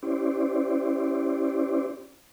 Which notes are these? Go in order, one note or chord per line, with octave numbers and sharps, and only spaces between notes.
C#4 E4 G4 C5 D5